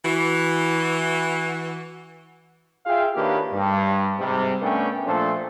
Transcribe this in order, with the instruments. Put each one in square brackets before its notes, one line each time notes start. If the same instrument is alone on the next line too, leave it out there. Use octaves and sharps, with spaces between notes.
[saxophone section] E3 F#4
[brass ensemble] F4 G#4 E5 F5 G5
D#3 A#3 D4 G4 B4 C#5
G2
G#2 C3 G3
A3 B3 C#4 D4 A#4 G5
A#2 F3 A3 D4 A4 C5